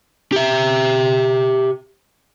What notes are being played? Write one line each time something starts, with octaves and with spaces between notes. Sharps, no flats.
G4 E5